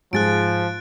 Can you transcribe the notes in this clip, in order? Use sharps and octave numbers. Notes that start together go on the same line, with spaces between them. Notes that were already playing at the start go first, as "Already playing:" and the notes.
G#2 F3 F#4 G#4 F#6 A6 D7